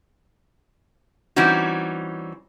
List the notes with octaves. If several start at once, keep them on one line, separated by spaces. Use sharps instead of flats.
E3 G3 C4 C#4 D#4 F#4